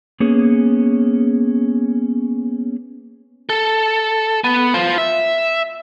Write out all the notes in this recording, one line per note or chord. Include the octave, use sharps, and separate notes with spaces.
A#3 B3 C#4 G#4
A4
B3
F4 C5
E5